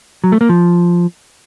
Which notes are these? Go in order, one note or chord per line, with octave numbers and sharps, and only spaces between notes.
F#3
A3
A#3
F3